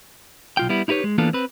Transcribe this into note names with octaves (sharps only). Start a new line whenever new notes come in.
B1 F4 G5
G3 B3 E4
D#4 E4 G4 B4 C#5
G#3
E3 A#3 B3 D4 F4 A4
C4 B4